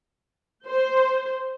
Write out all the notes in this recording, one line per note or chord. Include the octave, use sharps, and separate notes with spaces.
C5